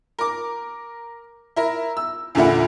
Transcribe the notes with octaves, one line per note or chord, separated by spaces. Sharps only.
A#4 D6
E4 A#4
E6
E2 A#2 D3 A#3 E4 F#5